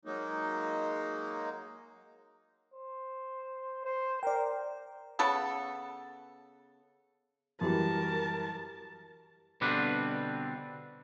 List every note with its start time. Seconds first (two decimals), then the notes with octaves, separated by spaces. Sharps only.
0.05 F#3 G#3 A#3 D#4
2.74 C5
3.85 C5
4.23 A#4 D5 G5
5.19 C#3 B3 A4
7.61 F#2 E3 G3 A#4 A5
9.61 B2 D3 G3 C4 D4 B4